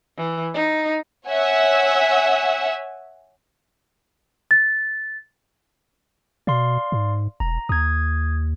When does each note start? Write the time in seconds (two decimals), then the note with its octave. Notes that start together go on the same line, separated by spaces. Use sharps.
0.18 E3
0.54 D#4
1.29 C#5 E5 F#5 G#5 E6
4.51 A6
6.47 B2 D5 F5 C6
6.92 G#2
7.40 E1 A#5
7.69 D#2 D#6 G#6